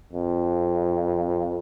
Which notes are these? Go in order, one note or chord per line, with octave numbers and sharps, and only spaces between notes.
F2